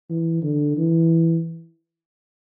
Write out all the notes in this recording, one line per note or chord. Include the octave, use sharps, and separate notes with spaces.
E3
D3
E3